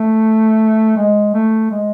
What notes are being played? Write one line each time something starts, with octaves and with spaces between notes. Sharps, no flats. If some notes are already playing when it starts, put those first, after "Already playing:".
Already playing: A3
G#3
A3
G#3